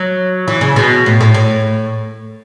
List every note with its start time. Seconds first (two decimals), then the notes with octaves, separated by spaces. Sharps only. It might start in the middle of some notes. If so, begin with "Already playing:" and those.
Already playing: F#3
0.48 E3
0.61 C#3
0.76 B2
1.06 A2
1.21 A2
1.34 A2